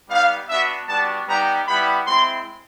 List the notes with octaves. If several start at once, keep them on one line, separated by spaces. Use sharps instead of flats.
G3 B3 D#4 F5
B3 D4 F#4 E5
G3 B3 D4 F#4 A5
G3 B3 D#4 G4 A#5
G3 B3 E4 G4 B5
G#3 C4 E4 C6